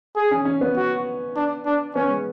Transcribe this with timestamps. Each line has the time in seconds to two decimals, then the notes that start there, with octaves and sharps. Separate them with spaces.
0.16 G#4
0.31 C#4
0.45 C#4
0.61 B3
0.76 F#4
1.36 D4
1.66 D4
1.95 B3 C#4
2.10 G#3